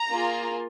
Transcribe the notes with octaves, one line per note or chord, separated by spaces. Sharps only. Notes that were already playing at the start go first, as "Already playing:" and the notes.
Already playing: A#5
A#3 F4 G#4